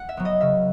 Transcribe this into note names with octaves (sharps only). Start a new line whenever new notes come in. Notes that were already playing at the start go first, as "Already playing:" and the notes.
Already playing: F#5
E5
F#3 B3
D#5
C#3 E5